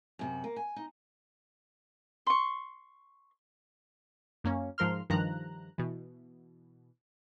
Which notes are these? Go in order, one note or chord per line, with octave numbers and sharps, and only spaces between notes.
F#2 C3 F#4
A#3
G#5
D#4
C6 C#6
F#2 A#3 C#4
G#2 F3 A#4 C6 F6
G2 D#3 F3 A#5 F#6
B2 E3